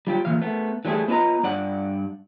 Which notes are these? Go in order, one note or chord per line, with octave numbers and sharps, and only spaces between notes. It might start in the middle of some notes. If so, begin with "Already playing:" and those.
G3 F4 G4
A#2 E3 F5
A3 B3
E3 G3 A3 E4 G#4
B3 D4 F4 B4 D#5 A#5
G2 D5 F#5